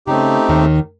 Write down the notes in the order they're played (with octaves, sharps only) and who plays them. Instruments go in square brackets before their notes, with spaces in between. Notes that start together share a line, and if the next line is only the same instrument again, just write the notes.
[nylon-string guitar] C#3 [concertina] A3 C4 D#4 G4
[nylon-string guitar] D#2 D#3